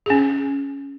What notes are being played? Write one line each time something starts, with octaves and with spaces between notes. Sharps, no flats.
C#4 G#4